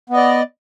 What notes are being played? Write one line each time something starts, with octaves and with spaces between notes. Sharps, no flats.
B3 D5 D#5